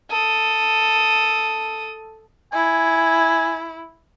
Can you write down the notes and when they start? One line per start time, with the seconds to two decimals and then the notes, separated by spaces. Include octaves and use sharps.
0.10 A4 D#6
2.53 E4 G#5